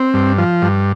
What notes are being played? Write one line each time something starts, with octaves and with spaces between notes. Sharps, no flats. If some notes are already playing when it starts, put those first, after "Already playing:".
Already playing: C4
G2
F3
G2